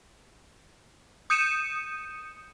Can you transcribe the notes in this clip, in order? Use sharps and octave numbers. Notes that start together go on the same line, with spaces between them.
D#6 G6 C#7 D#7 E7